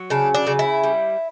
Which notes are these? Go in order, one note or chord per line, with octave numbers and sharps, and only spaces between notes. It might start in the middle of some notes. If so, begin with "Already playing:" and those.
Already playing: F#3
C#3 D4
D4
C#3
E4
G3